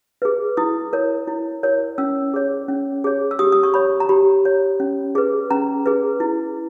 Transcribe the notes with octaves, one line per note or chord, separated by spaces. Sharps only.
G#4 B4
E4 D#6
A#4 C#5
E4
A#4 C#5
C#4 E6
G#4 C#5
C#4
G#4 C#5
E6
G4 D#6
D#6
C#6
C#5 B5
A#5
G4 B5
C#5
C#4
G#4 B4
C#4 A#5
G#4 B4
E4